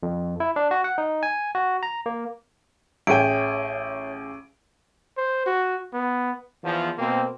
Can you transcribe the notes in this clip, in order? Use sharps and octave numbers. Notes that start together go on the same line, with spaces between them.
F2
E4
D4
F#4
F#5
D#4
G#5
F#4
A#5
A#3
A1 G#4 C#5 E5 G5 D7 D#7
C5
F#4
B3
E2 F3
B2 A#3 C4